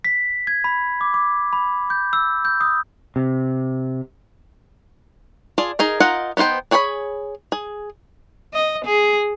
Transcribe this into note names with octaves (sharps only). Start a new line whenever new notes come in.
B6
G#6
B5
D6
D6
B5
G6
E6
G6
D#6
C3
F4 G#4 D5 A5
D#4 G#4 A#4
D#4 F4 A#4 D#5 F#5
B3 D#4 F4 C5 G5
D4 G#4 C#5 G#5 B5
G#4
D#5
G#4